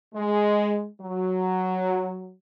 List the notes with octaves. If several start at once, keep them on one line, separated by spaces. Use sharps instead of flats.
G#3
F#3